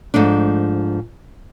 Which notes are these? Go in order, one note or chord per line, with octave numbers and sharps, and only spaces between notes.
G#2 F3 A3 D4